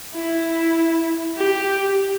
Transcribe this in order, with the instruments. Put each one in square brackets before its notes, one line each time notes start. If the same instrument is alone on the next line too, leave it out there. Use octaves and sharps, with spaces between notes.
[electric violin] E4
G4